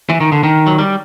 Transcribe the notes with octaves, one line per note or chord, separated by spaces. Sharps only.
E3
D#3
D3
D#3
F#3
G3